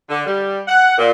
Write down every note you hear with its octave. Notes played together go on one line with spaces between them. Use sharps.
D3
G3
F#5
A#2